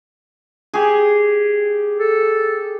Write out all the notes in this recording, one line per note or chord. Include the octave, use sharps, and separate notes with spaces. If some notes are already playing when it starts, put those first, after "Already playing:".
G4 G#4
A4